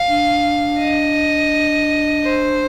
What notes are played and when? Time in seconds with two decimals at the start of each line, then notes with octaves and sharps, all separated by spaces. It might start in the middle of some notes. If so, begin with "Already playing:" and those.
Already playing: F5
0.08 D4
0.80 D#5
2.24 C5